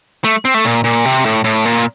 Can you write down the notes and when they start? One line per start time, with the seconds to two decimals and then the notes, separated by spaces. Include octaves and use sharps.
0.24 A3
0.45 C4
0.54 A3
0.65 A#2
0.84 A#2
1.05 C3
1.25 A2
1.44 A2
1.65 A#2